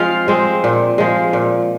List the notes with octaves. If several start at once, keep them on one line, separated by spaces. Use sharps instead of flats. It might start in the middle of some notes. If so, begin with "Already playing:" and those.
Already playing: F3 G#3 C4 F4 F5
G#3 C4
A#2
F3 G#3
A#2